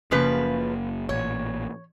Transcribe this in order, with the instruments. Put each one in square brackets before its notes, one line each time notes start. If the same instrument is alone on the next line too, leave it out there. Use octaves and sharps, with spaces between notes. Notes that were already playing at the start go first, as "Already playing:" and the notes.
[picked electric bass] F#1 A#3 [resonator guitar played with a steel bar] C#3 F3 B4
[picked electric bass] A1 A#2 [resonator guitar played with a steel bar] C#5